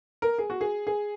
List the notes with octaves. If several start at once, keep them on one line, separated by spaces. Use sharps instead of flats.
A#4
G#4
F#4
G#4
G#4